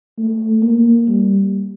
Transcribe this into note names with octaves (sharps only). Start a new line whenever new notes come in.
A3
A#3
G3